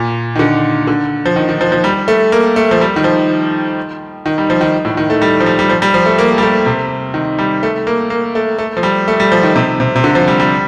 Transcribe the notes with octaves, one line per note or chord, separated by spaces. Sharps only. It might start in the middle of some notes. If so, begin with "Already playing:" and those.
Already playing: A#2
D#3
D3
D3
F3
D#3
D#3
F3
F3
G3
A3
A#3
A3
F3
G3
D#3
F3
D#3
G3
F3
D#3
A2
D#3
A3
G3
F3
G3
G3
F3
G3
F3
A3
A#3
G3
A3
C3
D#3
G3
A3
A#3
A#3
A3
A3
F3
G3
A3
G3
F3
D#3
C3
C3
C3
D3
F3
G3
G3